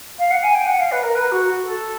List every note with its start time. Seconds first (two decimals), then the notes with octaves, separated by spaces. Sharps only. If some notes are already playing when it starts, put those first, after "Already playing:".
0.19 F5
0.31 F#5
0.43 G#5
0.55 G5
0.66 F#5
0.79 F5
0.91 B4
1.03 A#4
1.15 B4
1.31 F#4
1.64 A4